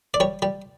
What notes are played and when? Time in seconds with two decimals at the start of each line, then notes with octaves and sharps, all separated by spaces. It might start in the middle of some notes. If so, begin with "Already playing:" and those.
0.14 D5
0.20 G3 C#5
0.42 G3